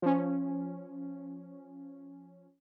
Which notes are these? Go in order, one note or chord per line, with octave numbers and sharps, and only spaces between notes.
F3 C#4